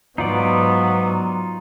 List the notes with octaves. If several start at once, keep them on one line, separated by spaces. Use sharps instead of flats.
G#2 F#3 B3 D#4 F4 D5